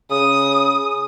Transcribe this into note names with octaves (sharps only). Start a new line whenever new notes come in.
C#3 D#6